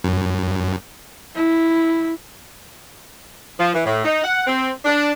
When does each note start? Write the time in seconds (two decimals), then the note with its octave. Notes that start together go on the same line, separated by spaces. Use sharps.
0.04 F#2
1.35 E4
3.59 F3
3.74 E3
3.86 A2
4.05 D#4
4.24 F#5
4.47 C4
4.85 D4